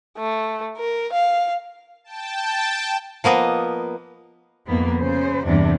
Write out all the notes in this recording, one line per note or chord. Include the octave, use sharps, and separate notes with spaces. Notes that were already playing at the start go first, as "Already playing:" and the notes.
A3
A#4
F5
G5 A5
F3 A#3 B3 D#5
F2 G#2 A#3 B3
C#3 C5
E2 G2 C3 D4